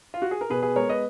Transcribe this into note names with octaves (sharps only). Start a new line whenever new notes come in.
F4
F#4
G#4
A#4
B2 G#4 B4
G#4 B4
G#3 B3 A#4 C#5
B4 D#5